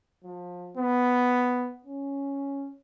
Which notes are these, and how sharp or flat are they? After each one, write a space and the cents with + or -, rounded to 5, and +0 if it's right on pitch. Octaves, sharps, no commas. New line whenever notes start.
F3 +30
B3 +5
C#4 +0